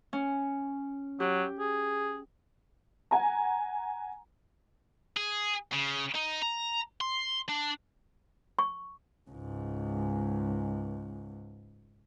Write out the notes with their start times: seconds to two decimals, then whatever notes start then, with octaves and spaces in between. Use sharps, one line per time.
0.13 C#4
1.20 F#3 G4
1.60 G#4
3.11 F#5 G#5 A#5
5.16 G#4
5.72 C#3
6.14 D#4
6.42 A#5
7.01 C6
7.49 D4
8.59 C#6
9.30 C#2 G#2